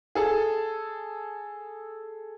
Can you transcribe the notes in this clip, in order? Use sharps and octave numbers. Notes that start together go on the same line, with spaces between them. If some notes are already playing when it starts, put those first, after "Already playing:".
G#4 A4 A5